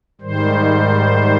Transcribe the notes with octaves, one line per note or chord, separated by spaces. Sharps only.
G#2 D#3 G3 C5